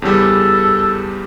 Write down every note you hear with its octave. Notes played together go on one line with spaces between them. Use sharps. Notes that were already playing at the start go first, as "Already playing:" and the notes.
E2 C#3 G3 B3 A4